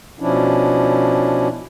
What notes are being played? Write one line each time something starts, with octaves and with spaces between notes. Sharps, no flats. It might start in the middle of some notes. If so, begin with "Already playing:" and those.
B2 F3 C#4 D4 E4